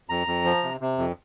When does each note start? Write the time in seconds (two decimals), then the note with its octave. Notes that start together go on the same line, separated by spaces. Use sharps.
0.09 F2 A#5
0.27 F2
0.45 F3
0.63 C3
0.81 C3
0.98 F2